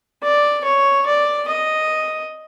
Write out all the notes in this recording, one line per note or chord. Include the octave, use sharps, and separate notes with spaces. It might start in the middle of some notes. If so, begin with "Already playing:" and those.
D5
C#5
D5
D#5